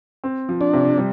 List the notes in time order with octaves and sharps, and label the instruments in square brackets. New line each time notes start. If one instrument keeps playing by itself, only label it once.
[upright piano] C4
F3
[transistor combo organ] D4
[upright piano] C3
G3